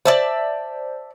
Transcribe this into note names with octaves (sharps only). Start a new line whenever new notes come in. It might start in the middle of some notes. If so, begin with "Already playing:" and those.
C5 D5 E5 A5